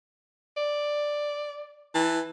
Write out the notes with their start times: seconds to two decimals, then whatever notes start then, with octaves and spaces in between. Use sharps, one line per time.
0.57 D5
1.94 E3 A5